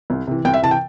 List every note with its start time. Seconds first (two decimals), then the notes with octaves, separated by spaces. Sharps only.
0.10 C2
0.27 C3 E3
0.45 C2 G5
0.53 E5
0.62 C3 E3 A5
0.71 G5